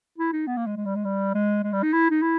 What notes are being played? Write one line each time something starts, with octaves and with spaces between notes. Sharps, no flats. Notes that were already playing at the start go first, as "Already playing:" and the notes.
E4
D#4
B3
A#3
G#3
G#3
G3
G#3
G3
G#3
G#3
G3
D#4
E4
D#4
E4